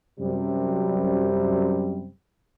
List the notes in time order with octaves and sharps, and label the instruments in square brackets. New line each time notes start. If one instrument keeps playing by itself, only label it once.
[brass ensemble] F#2 C3 G3